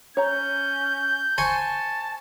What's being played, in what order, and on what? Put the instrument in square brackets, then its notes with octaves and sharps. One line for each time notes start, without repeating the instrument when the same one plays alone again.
[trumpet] C#4 [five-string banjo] C#5 A#5 [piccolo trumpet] G6
[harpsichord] C5 G#5 C#6 [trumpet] A5